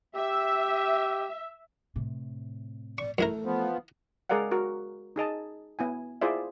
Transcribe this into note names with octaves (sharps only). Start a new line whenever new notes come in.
G4 E5
A2 C3
D5 C#6
F#2 E3 A3 E4 A#4
F3 B3
G#3 G#4 A#4 D5 F5 F#5
F#4 A#4
D#4 G#4 D#5 A5
B3 E4 G#5
E4 F4 G#4 C5 D5 E5